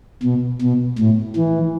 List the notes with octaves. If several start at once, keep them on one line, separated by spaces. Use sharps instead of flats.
B2
B2
A2
E3